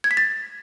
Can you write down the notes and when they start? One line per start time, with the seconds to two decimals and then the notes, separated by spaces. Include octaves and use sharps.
0.04 G#6
0.11 B6
0.17 A6